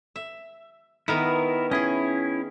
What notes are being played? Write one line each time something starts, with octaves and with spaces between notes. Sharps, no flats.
E5
D#3 B3 E4 A#4
C#4 E4 G#4 D#5